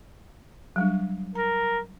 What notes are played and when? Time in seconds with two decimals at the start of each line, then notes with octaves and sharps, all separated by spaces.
0.76 F#3 G3 D4
1.35 A#4 A#5